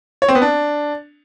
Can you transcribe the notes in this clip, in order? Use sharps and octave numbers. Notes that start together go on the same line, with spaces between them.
C#5
C4
B3
D4